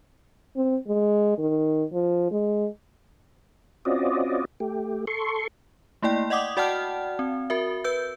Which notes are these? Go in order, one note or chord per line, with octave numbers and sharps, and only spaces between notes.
C4
G#3
D#3
F3
G#3
C4 C#4 F4 F#4 D5 D#5
A3 G4
A4 C6 C#6
A3 A#3 E4 D5 G5
D5 D#5 F#5 D6 D#6
F#4 D5 F#5 G5 A5 F6
C4
F#4 A#4 E5
B4 E6 G6